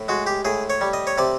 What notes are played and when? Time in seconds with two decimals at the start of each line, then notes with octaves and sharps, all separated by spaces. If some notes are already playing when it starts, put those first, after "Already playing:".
Already playing: A2
0.08 G#3 F#4
0.27 G4
0.45 A2 G#4
0.70 C#5
0.81 G3
0.93 D#5
1.07 C#5
1.18 C3 D5